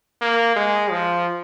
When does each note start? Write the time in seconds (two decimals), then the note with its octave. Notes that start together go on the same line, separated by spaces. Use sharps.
0.22 A#3
0.56 G#3
0.91 F3